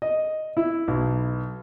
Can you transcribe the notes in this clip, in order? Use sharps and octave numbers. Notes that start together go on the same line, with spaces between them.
D#5
E4
B1